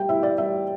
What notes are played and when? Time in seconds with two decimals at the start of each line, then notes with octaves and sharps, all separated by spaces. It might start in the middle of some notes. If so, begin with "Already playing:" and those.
Already playing: G3 G5
0.09 E4 E5
0.23 D5
0.38 G3 E5